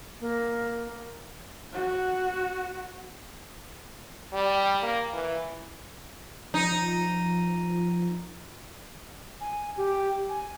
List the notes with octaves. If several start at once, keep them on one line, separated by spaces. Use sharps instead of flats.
A#3
F#4
G3
A#3
E3
F3 D#4
G#5
G4
G#5